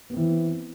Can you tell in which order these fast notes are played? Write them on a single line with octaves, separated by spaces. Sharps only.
B3 C4 E3